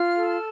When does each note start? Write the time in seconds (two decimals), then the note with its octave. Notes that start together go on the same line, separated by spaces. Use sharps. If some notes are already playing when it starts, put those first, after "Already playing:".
Already playing: F4 F6
0.16 A4